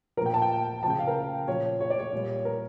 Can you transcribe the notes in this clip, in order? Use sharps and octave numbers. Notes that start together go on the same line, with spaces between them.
A#2 F3 A#4 G5
A5
G5
C#3 F3 G5 A5
F5
A#4
A#2 F3 C#5
C#5
D5
C#5
A#2 G3
A#4